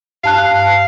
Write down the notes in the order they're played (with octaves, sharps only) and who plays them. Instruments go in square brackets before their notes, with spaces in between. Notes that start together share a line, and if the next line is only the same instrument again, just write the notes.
[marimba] G2 A5 F#6 [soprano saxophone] F5